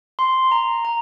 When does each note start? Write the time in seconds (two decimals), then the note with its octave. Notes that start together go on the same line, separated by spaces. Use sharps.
0.19 C6
0.51 A#5
0.85 A#5